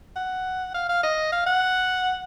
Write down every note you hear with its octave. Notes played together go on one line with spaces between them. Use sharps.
F#5
F5
F5
D#5
F5
F#5